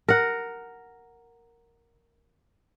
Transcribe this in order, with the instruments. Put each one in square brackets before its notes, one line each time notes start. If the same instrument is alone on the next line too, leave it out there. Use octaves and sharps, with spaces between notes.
[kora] A#4 F#5